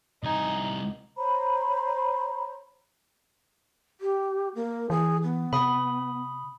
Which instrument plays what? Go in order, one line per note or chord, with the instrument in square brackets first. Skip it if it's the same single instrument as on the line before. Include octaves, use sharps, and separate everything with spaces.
[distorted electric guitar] C2 G#5 [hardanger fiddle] D#4
[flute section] C5 C#5 A#5 B5
[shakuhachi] G4
A#3
[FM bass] E3 [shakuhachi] G#4
[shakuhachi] B3
[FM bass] C3 [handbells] B5 D#6